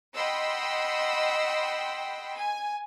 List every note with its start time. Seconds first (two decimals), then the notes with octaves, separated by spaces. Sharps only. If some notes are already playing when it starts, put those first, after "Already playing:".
0.15 D#5 F#5 G5 B5 C6 E6
2.36 G#5